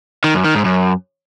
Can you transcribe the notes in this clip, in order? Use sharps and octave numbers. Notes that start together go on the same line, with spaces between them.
D#3
F#2
D#3
G#2
F#2